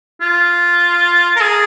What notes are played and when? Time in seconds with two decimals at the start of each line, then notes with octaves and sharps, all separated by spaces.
0.21 F4
1.36 A#4
1.41 G#4